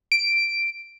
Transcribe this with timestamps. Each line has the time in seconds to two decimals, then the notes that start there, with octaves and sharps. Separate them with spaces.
0.12 D7